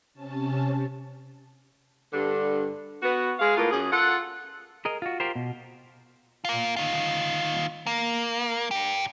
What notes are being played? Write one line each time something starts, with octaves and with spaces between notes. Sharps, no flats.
C3 C#4 A5
G2 D3
B3 F#4
G#3 G#4 F5
A2 A#3 B3 F4
F#2 G#4
F4 A4 F#5
G#4 A#4 D#5
F4 F#4
F4 G4 A#4 C5
B2
A#3 F4
D#3 F4
A#3
D4 G4